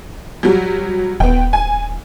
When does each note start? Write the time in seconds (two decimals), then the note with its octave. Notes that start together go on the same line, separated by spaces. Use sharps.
0.43 F#3 G3
1.20 D#1 B3 G5
1.53 G#5